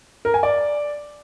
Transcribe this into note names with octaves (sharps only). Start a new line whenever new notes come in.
A#4
G#5
D5